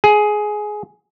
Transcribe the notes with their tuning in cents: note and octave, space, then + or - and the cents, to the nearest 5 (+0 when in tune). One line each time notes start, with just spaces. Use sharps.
G#4 +15